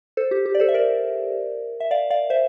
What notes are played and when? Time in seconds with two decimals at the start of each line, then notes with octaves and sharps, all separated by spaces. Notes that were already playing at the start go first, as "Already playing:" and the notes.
0.17 A4 C5
0.31 G4
0.46 G4
0.55 D5
0.60 A4 C5
0.68 E5
0.74 A#4 D5
1.80 E5
1.91 D5 F5
2.10 D5 F5
2.30 C5 E5